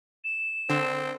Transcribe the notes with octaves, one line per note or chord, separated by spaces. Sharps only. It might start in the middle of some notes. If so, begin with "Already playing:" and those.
E7
D3 C4